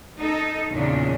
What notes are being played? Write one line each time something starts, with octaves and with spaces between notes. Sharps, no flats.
D#4 A4
E2 A#2 C#3 D4